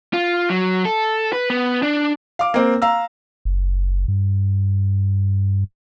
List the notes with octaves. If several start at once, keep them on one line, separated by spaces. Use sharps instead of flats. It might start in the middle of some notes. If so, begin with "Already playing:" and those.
F4
F#3
A4
B4
B3
D4
F5 D6
A#3 C4
F5 A#5 E6
F#1
G2